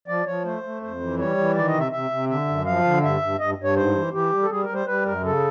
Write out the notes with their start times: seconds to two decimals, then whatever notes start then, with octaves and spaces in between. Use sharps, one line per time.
0.08 F3 D5
0.26 F3 C#5
0.45 A3 C5
0.63 A3
0.82 F2 C5
1.00 E3
1.18 G3 C#5
1.37 E3
1.55 D#3 D5
1.68 D#5
1.74 C3
1.80 E5
1.92 C3 E5
2.10 C3
2.29 D3 E5
2.48 F#2
2.66 F3 F5
2.84 D3
3.03 G2 E5
3.22 G2
3.39 G2 D#5
3.58 G2
3.64 C#5
3.76 G#2 C5
3.95 E3
4.13 E3 G4
4.32 G3
4.42 A4
4.50 G3 G#4
4.63 A#4
4.69 G3
4.74 C5
4.87 G3 B4
5.05 F#2 A#4
5.23 C#3 A4